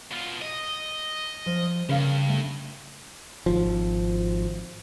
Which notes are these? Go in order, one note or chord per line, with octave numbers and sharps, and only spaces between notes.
B2 F4
D#5
F3
G2 C#3 A#4 F5
A3
G#1 F3